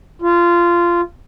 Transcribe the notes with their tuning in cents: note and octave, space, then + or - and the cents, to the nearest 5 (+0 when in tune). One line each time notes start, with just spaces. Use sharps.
F4 -15